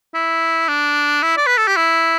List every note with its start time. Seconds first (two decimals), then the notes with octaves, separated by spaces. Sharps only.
0.14 E4
0.68 D4
1.22 E4
1.37 D5
1.47 B4
1.57 A4
1.67 G4
1.76 E4